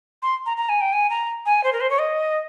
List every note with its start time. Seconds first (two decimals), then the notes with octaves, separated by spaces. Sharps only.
0.22 C6
0.46 A#5
0.57 A#5
0.69 G#5
0.81 G5
0.93 G#5
1.10 A#5
1.46 G#5
1.64 C5
1.73 A#4
1.81 C5
1.90 C#5
1.99 D#5